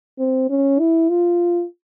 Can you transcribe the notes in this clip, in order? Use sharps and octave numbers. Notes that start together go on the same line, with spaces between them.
C4
C#4
E4
F4